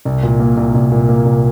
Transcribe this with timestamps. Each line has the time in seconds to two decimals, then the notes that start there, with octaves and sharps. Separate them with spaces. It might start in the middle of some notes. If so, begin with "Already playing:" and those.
0.05 C2
0.23 A#2
0.40 A#3
0.57 C2
0.74 C2
0.92 A#2
1.09 A#3
1.25 C2